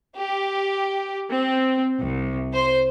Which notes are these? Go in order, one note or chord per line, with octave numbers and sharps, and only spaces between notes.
G4
C4
C2
C5